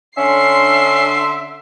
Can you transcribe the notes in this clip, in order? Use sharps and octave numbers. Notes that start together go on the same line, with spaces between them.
D3 C#4 D4 E5 C6 C7